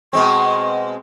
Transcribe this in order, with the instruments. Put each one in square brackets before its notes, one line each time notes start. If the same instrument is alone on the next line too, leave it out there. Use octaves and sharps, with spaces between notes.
[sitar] B2 G#3 C4 [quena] C#6